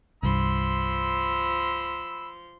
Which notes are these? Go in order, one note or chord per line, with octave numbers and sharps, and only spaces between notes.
C2 G2 F3 B5 C6 E6